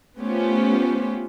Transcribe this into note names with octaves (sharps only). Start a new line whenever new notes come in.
A3 B3 C#4 F4 G4 C5